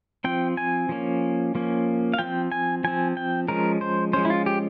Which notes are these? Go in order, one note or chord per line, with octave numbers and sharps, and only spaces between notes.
F3 C4 G5
G#5
F3 A#3 C#4
F3 A#3 C#4
F5
F3 C4 G5
G#5
F3 C4 G#5
G5
F3 G#3 C#4 A#4
C5
F3 G#3 C#4 C5
E4
F4
G4